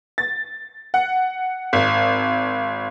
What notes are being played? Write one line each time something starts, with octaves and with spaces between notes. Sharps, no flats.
A6
F#5
G#1